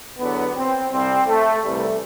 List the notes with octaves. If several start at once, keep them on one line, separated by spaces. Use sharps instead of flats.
E2 D3 F#3 B3
C4
C2 C3 G3 C4
A3
C2 C3 E3 G3 A3